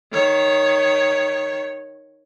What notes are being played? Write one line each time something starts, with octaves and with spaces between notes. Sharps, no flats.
D#3 C#5